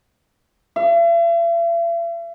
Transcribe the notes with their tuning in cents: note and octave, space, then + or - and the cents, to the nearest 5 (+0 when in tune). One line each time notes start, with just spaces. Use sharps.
E5 +45